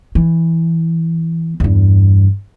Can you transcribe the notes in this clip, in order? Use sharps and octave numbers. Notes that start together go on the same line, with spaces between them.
E3
E2 G2